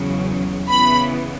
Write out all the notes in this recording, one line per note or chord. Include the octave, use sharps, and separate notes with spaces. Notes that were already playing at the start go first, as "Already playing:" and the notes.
Already playing: E2 C#3 F#3
C#3 E3 B3 B5